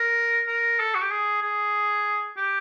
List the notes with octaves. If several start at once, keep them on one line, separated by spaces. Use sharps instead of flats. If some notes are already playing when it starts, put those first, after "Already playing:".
Already playing: A#4
A#4
A4
F#4
G4
G#4
G#4
G4